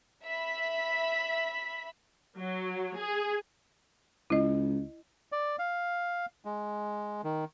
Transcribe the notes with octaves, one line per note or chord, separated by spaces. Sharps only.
E5 B5 B6
F#3
G#4
C#2 E4 D#5
D5
F5
G#3
D#3